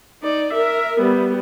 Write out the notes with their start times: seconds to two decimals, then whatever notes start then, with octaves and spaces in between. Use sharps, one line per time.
0.23 D#4 D5
0.53 A#4 E5
1.00 G3 B3